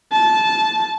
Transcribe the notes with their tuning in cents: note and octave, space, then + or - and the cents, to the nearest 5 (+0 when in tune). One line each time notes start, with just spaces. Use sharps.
A5 -15